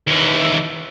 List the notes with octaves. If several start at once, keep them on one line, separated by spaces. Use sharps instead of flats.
D#2 E3